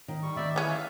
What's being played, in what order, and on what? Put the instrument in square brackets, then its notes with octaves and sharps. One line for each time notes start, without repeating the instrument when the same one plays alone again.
[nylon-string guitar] D#3
[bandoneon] G3 C#6
[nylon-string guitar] D#3 B3 G5 [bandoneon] D5 E5
[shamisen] E3 C#4 [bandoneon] B4
[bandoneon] E5 F5